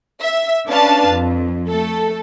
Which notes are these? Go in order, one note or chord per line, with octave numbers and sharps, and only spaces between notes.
E5
C#4 D4 B4 F5 A5
F2
A3 A4